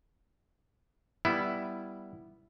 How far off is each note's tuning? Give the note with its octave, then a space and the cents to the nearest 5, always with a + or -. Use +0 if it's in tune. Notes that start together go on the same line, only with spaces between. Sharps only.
G3 +0 B3 +0 E4 +0